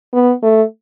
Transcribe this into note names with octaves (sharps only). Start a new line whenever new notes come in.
B3
A3